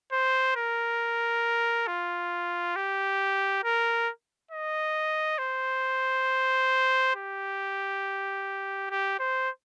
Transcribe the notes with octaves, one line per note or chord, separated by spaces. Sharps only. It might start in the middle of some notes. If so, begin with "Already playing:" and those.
C5
A#4
F4
G4
A#4
D#5
C5
G4
G4
C5